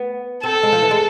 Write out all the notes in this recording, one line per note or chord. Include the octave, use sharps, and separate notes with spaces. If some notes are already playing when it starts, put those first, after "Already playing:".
Already playing: B3
C4 A4
G#3
F3
E3
G#3